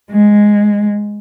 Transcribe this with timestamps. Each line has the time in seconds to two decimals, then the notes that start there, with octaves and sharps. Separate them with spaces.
0.11 G#3